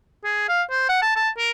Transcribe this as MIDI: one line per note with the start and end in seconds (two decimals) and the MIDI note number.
0.24 0.46 68
0.48 0.62 77
0.71 0.85 72
0.89 1.00 78
1.02 1.11 81
1.16 1.29 81
1.38 1.51 70